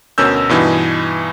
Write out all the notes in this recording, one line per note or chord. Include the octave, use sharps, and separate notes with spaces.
D2 B2 C#4 A#4 E6 G6
G2 B2 E3 D#4